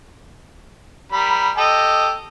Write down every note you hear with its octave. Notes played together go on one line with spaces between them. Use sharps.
G3 A#4 B5
G4 A4 D#5